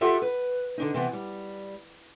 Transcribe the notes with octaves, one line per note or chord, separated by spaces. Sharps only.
F4 G4 A4 E5 F#5
B4
D3 D4 D#4
C3 E3 B3
G3